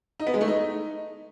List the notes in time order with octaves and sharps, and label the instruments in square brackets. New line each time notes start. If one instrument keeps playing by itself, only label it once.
[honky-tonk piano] D#4
B3
G#3
A3
D#4